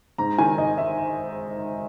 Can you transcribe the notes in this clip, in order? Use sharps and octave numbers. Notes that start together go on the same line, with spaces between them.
G#2 A#5
D#3 G#5
G#1 D#5
E5